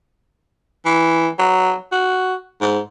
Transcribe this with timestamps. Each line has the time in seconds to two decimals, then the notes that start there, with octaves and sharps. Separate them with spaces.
0.85 E3
1.39 F#3
1.92 F#4
2.61 G#2